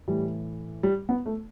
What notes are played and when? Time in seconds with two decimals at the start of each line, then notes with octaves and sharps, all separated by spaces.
0.08 A2 E3 G3
0.83 G3
1.09 B3
1.26 A3